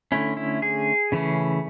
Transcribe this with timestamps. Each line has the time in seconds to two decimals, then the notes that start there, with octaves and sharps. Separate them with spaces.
0.12 D3 A3 C#4 E4
0.37 E4
0.62 G#4
1.12 C#3 E3 A3 C#4